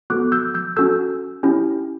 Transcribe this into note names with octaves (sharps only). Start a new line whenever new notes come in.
B3 F#4 A4 D6 F#6
E6 G6
E6 G6
C#4 F#4 A4 E6 G6
C#4 E4 G4